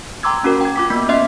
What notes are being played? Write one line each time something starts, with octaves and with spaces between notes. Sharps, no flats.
G5 A#5 C6 D6 E6 G#6
A#3 C#4 F#4 A#4
G5 G#6
F4 D6 B6
A#3 B3 B6
C#4 D#5 E5 C6 F6 C7